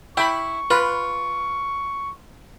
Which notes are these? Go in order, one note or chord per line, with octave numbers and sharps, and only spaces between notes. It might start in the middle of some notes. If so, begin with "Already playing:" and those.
E4 G5 B5 C#6
F4 B4